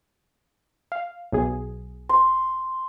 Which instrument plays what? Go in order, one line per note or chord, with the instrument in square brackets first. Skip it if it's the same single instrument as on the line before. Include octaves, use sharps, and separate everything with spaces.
[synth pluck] F5
B1 G#4
[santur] C6